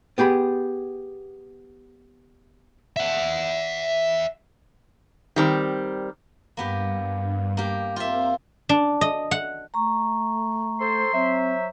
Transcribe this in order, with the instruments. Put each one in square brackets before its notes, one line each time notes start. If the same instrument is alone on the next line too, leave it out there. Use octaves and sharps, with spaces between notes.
[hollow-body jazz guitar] B3 G4 G#4 B5
[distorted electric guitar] E5 F#5
[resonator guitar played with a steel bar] D#3 G3 C4
[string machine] G2 [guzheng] A#3 B3 G4
[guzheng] A#3 G4
[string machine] C4 A#4 C5 [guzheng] F4 E5
[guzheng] D4
D#5
F#5
[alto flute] A3 [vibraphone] A#5 C#6
[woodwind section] A4 C5 [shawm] C6
[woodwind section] F#3 C5 E5 [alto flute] C4